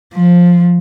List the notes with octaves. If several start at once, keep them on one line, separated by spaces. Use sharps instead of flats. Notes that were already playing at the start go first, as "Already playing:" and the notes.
F3